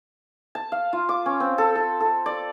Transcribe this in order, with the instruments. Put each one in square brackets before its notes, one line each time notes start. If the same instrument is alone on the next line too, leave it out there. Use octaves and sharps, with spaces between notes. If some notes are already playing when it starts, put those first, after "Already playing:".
[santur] A5
F5
F4
D6
C#4
C4
A4
A4
A4
D5